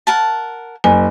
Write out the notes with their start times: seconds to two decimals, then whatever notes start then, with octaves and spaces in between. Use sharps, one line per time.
0.07 A#4 F#5 A5
0.84 F#1 G#5